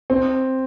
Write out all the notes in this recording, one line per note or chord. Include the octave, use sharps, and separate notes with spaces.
C4